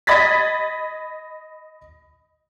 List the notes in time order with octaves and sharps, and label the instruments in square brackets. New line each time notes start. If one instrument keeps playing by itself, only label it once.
[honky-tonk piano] D#5 B5 G#6 A6 B6